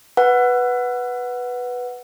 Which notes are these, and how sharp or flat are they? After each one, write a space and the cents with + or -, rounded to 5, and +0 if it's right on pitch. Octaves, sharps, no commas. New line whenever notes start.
B4 +0 F#5 +0